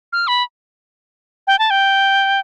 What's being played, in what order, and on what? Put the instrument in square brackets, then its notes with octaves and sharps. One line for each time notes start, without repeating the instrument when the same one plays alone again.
[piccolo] F6
B5
G5
A5
G5